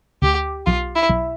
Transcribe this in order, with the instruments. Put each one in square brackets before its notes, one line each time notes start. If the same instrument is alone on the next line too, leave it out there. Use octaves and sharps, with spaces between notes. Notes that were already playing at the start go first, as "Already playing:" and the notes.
[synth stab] D2 [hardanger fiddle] G4
[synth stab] B1 [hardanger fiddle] F4
[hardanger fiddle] E4
[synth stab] B1